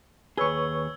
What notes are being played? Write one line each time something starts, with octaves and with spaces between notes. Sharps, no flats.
D#2 G#4 B4 C#5 C#6 E6 G#6 G7